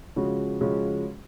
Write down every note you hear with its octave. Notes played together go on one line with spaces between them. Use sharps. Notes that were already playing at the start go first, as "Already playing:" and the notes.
C#3 F3 G#3 C#4 F#4
C#3 F3 G#3 C#4 F#4